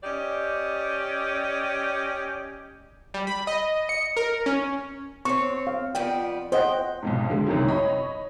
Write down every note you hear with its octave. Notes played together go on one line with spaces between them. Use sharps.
C#4 G4 D5 D#5
G3
B5
D#5
C#7
A#4
C#4
C4 C#5 C#6
F5
F2 B3 D5 G5
C5 D#5 F#5 G5
B1 F2 G#2
D3 G#3
C2 F#2 D#3 F#3
C#5 D#5 B5